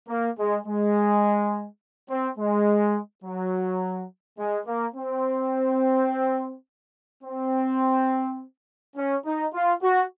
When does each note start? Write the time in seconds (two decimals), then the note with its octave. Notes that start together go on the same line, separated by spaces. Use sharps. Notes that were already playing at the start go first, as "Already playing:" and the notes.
0.08 A#3
0.38 G#3
0.66 G#3
2.09 C4
2.38 G#3
3.24 F#3
4.38 G#3
4.66 A#3
4.95 C4
7.24 C4
8.96 C#4
9.25 D#4
9.54 F4
9.82 F#4